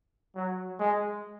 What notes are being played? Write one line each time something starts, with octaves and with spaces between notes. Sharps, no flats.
F#3
G#3